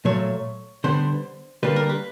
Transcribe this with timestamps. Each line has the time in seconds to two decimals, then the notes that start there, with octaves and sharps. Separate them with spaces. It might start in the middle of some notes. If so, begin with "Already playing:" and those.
0.05 A#2 F#3 A3 C#5
0.84 D3 G3 B3 C5
1.63 D3 G3 A#3 B4
1.76 A#4
1.89 B4